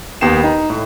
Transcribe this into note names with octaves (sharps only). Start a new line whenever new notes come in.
D#2 B3 G5 C7 E7
D#4
A2